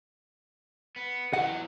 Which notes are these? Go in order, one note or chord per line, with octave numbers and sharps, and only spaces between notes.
B3
E2 F#3 D#5 F#5